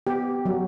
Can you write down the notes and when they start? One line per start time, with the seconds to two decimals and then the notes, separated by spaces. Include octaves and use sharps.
0.07 B3 G4
0.45 F#3